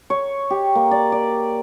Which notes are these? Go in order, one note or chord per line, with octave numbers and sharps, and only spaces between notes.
C#5
G4
A#3
D5
D5